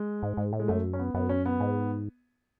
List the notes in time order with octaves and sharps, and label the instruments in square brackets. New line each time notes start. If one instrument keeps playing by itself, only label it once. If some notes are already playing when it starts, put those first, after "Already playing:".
Already playing: [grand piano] G#3
[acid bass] G#2
G#2
A2
[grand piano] G#3
[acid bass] F#2 [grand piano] A3
[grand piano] C#4
B3
[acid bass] F#2 [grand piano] B3
[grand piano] C#4
B3
[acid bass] G#2